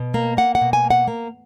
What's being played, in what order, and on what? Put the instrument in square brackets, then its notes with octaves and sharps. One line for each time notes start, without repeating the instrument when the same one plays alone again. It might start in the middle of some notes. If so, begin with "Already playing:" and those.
Already playing: [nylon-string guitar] B2
A#3
A#3 F#5
F#5
B2
G#5
A#3
F#5
A#3